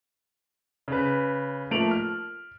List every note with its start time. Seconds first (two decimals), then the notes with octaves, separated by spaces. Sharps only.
0.88 C#3 B4
1.71 F3 A3 A#3 D7 F7 F#7
1.91 F6